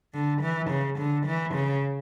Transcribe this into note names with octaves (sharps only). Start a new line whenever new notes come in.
D3
E3
C#3
D3
E3
C#3